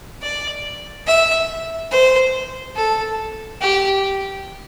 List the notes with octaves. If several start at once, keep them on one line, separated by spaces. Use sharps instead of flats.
D5
E5
C5
A4
G4